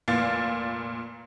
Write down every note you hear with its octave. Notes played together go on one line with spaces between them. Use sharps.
F1 A#2 F5 A6